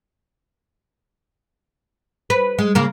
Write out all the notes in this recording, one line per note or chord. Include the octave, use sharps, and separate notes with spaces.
B4
G#3
C#3 A#3 A#4